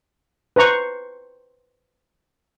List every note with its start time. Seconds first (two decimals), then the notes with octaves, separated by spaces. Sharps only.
0.56 B4 C5 A#5 C#6